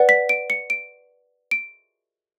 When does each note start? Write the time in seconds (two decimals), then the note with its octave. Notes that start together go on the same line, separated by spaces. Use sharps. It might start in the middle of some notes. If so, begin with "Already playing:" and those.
Already playing: B4 D5 F#5
0.09 B6
0.29 D7
0.50 C#7
0.70 D7
1.51 D7